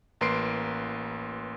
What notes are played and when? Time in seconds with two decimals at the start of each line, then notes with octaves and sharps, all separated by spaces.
0.21 A1 A#3 B4 C6 C7 D7